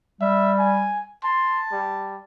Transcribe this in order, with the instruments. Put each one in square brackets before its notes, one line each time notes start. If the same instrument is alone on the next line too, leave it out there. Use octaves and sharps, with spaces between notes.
[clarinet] G3 [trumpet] E5
[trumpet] G#5
[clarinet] A5 [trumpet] C6
[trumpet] G3